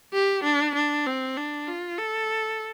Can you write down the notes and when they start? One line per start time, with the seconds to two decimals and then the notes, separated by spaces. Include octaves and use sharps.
0.14 G4
0.44 D4
0.75 D4
1.06 C4
1.37 D4
1.68 F4
1.98 A4